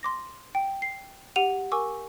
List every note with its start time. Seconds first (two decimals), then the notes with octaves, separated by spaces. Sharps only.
0.03 C6 D6 A#6
0.55 G5
0.82 C7
1.36 G4 F#5 D#7 F7
1.72 A#4 G#5 C#6 D6 E6